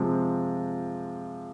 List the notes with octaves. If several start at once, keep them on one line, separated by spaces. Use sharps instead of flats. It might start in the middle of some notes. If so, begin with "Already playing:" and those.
Already playing: C3 F3 G#3